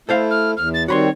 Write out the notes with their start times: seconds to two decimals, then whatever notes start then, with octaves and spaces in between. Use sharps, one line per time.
0.09 A3 E4 A4 C5 F5
0.31 F6
0.57 E2 F6
0.74 A6
0.88 D#3 G3 C4 F#4 C#5 B5 C6